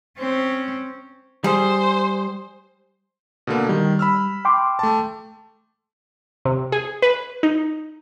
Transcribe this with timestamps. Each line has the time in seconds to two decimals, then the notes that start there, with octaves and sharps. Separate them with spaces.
0.18 C4 C#4
1.44 G3 G#4 C5
3.47 B2 D3 A#3
3.69 D#3 G3
3.99 B5 E6 F6
4.45 G5 C6 D6
4.79 A3 A5
6.45 C3
6.72 G#4
7.02 B4
7.43 D#4